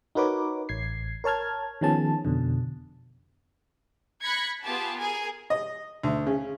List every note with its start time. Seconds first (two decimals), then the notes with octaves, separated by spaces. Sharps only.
0.15 D#4 F#4 A#4 B4 C#5 D6
0.69 A1 G#6 C7
1.24 A#4 C#5 A5 F6 G#6
1.81 D#3 F3 B3 C#4 G#4 A5
2.25 F2 B2 D3
4.22 B5 F#6 G#6 A#6 B6 C#7
4.64 B3 F4 G4 G#4 A5
4.97 G#4 A#4 G#5
5.50 D#5
6.04 D2
6.26 C#3